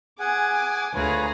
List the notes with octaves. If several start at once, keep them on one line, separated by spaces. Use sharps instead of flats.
G#4 F#5 G#5 D6
D2 F4 G#4 B4 C#5 A#5